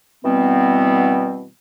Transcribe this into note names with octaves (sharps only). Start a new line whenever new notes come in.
B2 E3 G3 B3 C4